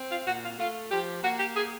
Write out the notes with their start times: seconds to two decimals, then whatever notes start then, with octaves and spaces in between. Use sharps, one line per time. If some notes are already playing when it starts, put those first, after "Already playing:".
Already playing: C4
0.09 F4
0.26 A#2 F#4
0.42 F4
0.58 A3 F4
0.90 F3 G4
1.23 A#3 F#4
1.38 G4
1.55 G#4